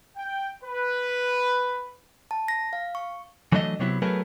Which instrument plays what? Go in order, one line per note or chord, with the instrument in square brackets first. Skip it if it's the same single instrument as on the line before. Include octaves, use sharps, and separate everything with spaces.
[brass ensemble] G5
B4
[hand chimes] A5
A#6
F5
C#6
[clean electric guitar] E3 F#3 A3 D4 E4 D#5
C3 F#3 B3 E4
F#3 A3 B3 G#4 A#4 B4